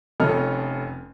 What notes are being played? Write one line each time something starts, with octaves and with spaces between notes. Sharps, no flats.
F1 F2 C#4 A4 D#5 F6